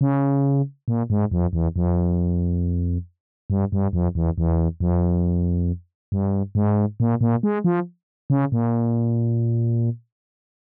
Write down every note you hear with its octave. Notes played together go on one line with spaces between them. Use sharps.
C#3
A#2
G#2
F2
E2
F2
G2
G2
F2
E2
E2
F2
G2
G#2
A#2
A#2
G#3
F3
C#3
A#2